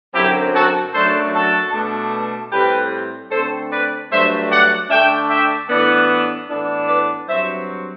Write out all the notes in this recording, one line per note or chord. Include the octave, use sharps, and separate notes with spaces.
F#2 D3 F#3 C4 E4 G4
F#4 A4
F#2 F#3 A3 D4 A4 C5
F#4 A4
B2 A3 D4
A2 G3 C4 G4 B4
D3 A3 C4 A4 C5
B4 D5
G2 F#3 A3 D4 C5 E5
D5 F#5
D3 A3 D4 E5 G5
E5 G5
A2 E3 B3 D4 D5 F#5
A2 E3 B3 D4
B4 D5
G2 F#3 C4 C5 E5